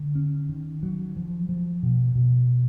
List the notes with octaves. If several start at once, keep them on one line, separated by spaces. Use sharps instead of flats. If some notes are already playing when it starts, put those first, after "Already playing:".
Already playing: D3
C#4
D#3
F#3
F3
F3
B2
B2